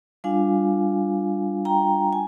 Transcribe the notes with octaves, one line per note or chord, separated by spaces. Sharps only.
G3 D4 F4 F5 G#5
G5 A#5
G#5